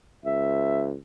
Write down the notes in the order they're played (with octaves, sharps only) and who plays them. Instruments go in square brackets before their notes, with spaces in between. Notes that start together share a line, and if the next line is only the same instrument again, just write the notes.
[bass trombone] C#2 [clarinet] E5